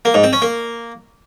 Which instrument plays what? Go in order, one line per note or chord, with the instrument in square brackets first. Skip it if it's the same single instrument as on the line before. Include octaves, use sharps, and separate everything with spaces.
[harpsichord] A#3
G#2
C4
C#4
A#3